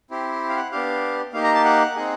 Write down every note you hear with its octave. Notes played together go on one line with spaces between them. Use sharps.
C4 E4 G4
F5
F#5
B3 D4 G4 F5
A#3 D#4 G4 F5
A#5
A5
F#5
C4 D#4 G#4